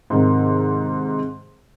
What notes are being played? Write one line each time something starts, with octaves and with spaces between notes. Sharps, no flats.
G#2 C3 D#3